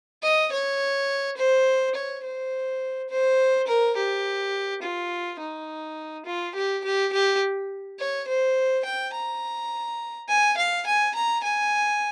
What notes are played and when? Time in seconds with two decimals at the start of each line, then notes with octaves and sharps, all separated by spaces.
0.23 D#5
0.52 C#5
1.37 C5
1.95 C#5
2.24 C5
3.09 C5
3.67 A#4
3.96 G4
4.82 F4
5.39 D#4
6.26 F4
6.55 G4
6.84 G4
7.12 G4
7.99 C#5
8.27 C5
8.85 G5
9.13 A#5
10.29 G#5
10.57 F5
10.86 G#5
11.15 A#5
11.44 G#5